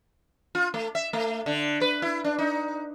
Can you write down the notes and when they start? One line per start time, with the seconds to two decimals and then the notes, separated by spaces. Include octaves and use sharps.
0.55 F4
0.74 A3
0.95 E5
1.13 A3
1.46 D3
1.81 B4
2.02 E4
2.24 D4
2.39 D#4